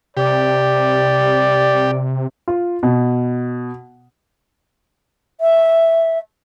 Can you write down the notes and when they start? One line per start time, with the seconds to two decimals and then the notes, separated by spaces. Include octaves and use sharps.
0.17 C3 G4 D5
2.48 F4
2.83 B2
5.40 E5